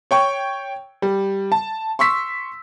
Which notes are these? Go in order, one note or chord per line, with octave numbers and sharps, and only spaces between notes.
C#5 G5 C#6
G3
A5
C6 C#6 E6 B6